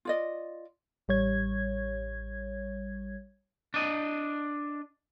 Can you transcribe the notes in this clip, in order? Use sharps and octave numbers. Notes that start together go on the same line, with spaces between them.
F4 D5 D#5
A1 G3 C#5 G#6
D4 D#5